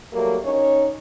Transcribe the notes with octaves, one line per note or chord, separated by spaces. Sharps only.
F#3 G3 A3 A#3
C#4 D#4 C#5